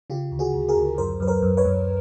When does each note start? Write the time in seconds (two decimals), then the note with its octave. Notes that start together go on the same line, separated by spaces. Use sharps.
0.10 C#3 F4 G4
0.32 D2
0.39 F#4 G#4
0.54 D2
0.69 G#4 A#4
0.77 D2
0.98 F#2 A#4 C5
1.20 F#2 B4
1.27 A#4 C5
1.42 F#2
1.57 B4 C#5
1.65 F#2